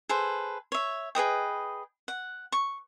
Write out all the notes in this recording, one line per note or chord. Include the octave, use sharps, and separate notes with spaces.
G#4 A4 B4 C5
C#5 E5
G#4 B4 D#5 G5
F#5
C#6